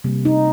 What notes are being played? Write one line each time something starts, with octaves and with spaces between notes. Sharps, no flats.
C3 G3 A#3
D#4